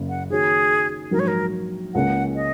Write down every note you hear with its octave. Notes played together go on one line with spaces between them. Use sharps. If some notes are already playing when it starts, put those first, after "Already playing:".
Already playing: F#1 F#2 C#3 A#3
F#5
D#3 A#3 F#4 G#4 C#5
A#1 G#2 F#3 A#3 F#4 A#4
C#5
A#4
C#2 C#3 A#3 C#4 F#5
D#5